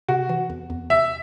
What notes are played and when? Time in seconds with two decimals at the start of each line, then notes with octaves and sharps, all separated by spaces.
0.09 C3 F#4
0.29 E3
0.50 E2
0.70 E2
0.90 C3 E5